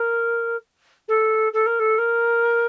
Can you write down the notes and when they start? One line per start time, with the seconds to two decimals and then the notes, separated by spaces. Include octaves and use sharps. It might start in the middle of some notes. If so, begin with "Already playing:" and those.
Already playing: A#4
1.08 A4
1.53 A4
1.66 A#4
1.79 A4
1.98 A#4